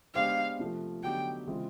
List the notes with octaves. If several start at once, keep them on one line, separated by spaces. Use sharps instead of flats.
G#3 B3 D4 G4 C5 F5
C3 F3 A3
D3 F#3 B3 D#4 G4 G5
C#3 E3 G#3 C4 F4